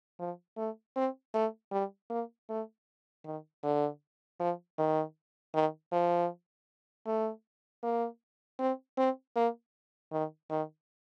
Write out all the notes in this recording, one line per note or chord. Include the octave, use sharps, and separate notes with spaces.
F3
A3
C4
A3
G3
A#3
A3
D#3
D3
F3
D#3
D#3
F3
A3
A#3
C4
C4
A#3
D#3
D#3